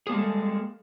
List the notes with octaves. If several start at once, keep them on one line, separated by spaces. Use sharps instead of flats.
G3 G#3 A#3 G#4 A4